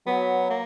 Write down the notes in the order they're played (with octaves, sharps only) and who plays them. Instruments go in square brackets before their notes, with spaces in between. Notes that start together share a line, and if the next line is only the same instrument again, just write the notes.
[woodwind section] F#3 [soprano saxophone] B3
[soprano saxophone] A#3